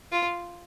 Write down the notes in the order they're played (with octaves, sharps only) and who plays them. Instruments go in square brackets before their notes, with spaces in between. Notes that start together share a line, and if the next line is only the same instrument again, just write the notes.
[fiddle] F4